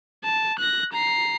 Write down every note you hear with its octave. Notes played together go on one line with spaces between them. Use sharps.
A5
F#6 A#6
A#5 C7